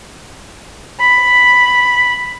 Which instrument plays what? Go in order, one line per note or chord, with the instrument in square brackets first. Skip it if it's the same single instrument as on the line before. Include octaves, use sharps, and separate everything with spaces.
[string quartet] B5